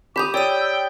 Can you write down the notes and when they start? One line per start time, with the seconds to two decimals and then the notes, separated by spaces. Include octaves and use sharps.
0.16 G4 B5 D6 D#6 G6 F7
0.34 C#5 D5 G5 E6 D#7